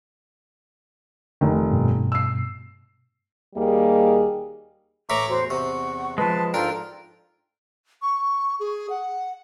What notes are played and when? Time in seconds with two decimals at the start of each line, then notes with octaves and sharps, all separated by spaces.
1.41 F1 D#3
1.71 G2 B2
2.12 E6 C7
3.55 D#2 G3 A#3 G4 G#4 D#5
5.10 A2 E3 A#5 B5 C#6 D6
5.28 E2 F#4 C5
5.50 C3 F#5 C#6
6.18 F3 G#3 B4 A5
6.54 G#2 D4 F4 A4 A#4 G5
8.02 C#6
8.60 G#4
8.90 F#5